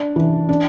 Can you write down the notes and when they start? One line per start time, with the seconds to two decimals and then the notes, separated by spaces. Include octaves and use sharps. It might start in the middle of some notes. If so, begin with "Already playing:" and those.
Already playing: D4
0.16 E3
0.49 D4